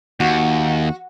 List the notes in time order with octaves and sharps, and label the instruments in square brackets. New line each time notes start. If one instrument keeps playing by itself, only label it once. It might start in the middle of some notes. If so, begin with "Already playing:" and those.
[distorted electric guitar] D#2 [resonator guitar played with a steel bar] F#4